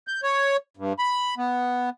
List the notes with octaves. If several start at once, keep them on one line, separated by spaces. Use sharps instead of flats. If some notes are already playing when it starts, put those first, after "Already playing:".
G6
C#5
G2
B5
B3